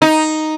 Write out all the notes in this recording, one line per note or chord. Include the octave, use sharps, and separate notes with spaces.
D#4